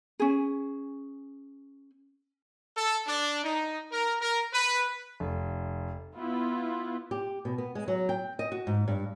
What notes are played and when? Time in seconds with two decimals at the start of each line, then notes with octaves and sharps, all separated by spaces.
0.20 C#4 G#4
2.77 A4
3.07 D4
3.44 D#4
3.92 A#4
4.21 A#4
4.53 B4
5.20 F1
6.14 B3 E4 F4
7.11 G4
7.45 B2
7.58 B3
7.75 G#3
7.88 F#3
8.09 G5
8.39 D#5
8.52 F#4
8.67 G#2
8.88 G2